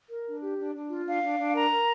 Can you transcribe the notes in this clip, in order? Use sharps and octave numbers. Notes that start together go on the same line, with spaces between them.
A#4
D4
G4
D4
D4
F4
D4 F5
D4
D4
A#4 A#5
A#4